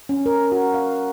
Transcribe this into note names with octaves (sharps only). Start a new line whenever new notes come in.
C#4
A#4
F#4
F5